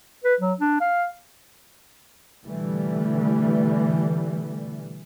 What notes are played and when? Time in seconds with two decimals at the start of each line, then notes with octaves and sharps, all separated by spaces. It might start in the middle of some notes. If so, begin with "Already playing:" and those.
0.24 B4
0.40 F#3
0.60 D4
0.81 F5
2.43 B2 D3 E3 G3 A3